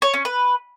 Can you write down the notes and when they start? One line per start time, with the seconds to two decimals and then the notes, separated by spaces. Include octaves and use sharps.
0.02 C#5
0.14 C#4
0.25 B4